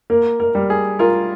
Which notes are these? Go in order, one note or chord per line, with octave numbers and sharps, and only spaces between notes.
A#3 A#4
A#4
G3
G#4
F4 A#4